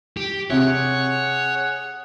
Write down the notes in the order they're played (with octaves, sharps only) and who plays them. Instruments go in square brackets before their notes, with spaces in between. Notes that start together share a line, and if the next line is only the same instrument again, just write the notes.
[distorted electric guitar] G4
[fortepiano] C3 [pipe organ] G#4 F#5 [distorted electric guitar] C#5